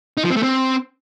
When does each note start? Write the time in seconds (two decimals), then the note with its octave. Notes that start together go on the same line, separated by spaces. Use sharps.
0.17 D#4
0.24 F3
0.30 C4
0.36 A3
0.43 C4